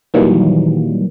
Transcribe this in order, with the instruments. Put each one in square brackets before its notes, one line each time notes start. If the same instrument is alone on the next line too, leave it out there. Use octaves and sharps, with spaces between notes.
[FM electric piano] A#2 D#3 E3 F#3 G3 A#3